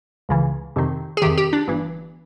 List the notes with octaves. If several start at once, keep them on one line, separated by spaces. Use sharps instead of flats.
C#2 C#3 E3
F2 C3 D#3
G#4
F2 C3 D#3 G4
G4
D4
G1 G2 E3